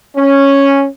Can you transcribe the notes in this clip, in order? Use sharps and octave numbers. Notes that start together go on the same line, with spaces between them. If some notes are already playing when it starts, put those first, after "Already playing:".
C#4